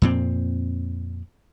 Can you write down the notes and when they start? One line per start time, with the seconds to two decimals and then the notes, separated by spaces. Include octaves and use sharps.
0.02 F2 A#2 C4